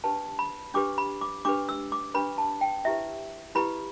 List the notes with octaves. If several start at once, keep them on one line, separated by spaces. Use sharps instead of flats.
D4 G4 B4 A5
B5
D4 G4 B4 D6
B5
D6
D4 G4 B4 D6
E6
D6
D4 G4 B4 B5
A5
G5
E4 G4 B4 E5
E4 G4 B4 B5